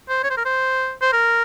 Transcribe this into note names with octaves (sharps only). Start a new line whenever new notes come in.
C5
C#5
C5
A#4
C5
C5
A#4